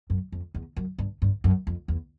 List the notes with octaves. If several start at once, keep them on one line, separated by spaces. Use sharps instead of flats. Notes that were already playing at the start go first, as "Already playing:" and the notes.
F#2
F2
E2
F#2
G2
G2
F#2
F2
E2